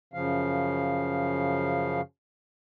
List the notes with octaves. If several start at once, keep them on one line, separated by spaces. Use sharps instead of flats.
F#2 C#3 F3 F5